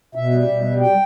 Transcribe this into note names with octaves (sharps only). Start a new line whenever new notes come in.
B2 E5
G3
B2
G3
G5